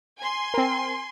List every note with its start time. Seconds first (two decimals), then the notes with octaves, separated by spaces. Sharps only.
0.18 G#5 C6
0.54 C4 A#4